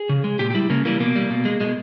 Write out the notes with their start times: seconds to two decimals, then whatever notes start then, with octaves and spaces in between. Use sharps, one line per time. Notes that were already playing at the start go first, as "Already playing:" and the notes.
Already playing: G#4
0.09 C#3
0.24 G#3
0.39 A#2 G4
0.50 G4
0.54 G3 E4
0.70 C#3 A#3
0.85 E3 G3 A#3
1.00 B2 A#3
1.15 G3
1.30 B2
1.45 G#3
1.60 B2 G#3